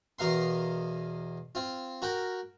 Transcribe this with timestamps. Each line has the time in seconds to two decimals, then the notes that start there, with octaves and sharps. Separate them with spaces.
0.19 E2 B2 A#4 F5 C6
1.55 C4 F4
2.02 F#4 A#4 G5